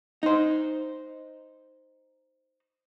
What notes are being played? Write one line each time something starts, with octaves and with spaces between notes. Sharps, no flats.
D#4 C5